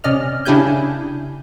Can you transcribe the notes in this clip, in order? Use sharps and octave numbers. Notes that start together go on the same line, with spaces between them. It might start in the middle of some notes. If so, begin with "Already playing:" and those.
C3 C#4 D5 D#5 F6
C#3 D4 E4 G4 G#5 G6